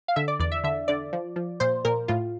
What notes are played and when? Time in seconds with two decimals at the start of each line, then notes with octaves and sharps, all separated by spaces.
0.08 F5
0.16 D3 E5
0.28 D5
0.40 E2 D5
0.52 E5
0.64 D3 E5
0.88 D3 D5
1.13 F3
1.36 F3
1.60 A#2 C5
1.85 A#2 A#4
2.08 A2 F4